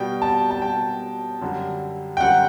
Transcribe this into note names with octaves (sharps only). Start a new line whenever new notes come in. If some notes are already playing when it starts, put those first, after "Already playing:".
Already playing: B2 G3 G5
A5
A5
B2 G3 G5
F#2 D3 G3
G5
F#2 D3 G3 F#5